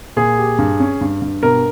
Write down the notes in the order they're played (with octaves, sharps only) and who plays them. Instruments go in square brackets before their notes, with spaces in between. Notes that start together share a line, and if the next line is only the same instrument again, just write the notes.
[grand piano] A#2 [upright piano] G#4
[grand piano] G4
G2
C#4
G2
G2
[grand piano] B2 [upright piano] A#4